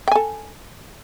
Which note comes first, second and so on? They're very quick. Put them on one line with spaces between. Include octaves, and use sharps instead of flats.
G5 G#5 A4